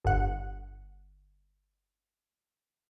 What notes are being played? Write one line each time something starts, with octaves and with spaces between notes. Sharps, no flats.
G1 F#5